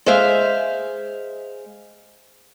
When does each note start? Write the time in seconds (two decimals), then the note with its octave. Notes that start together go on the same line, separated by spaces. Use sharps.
0.06 G#3 G#4 C5 E5 F5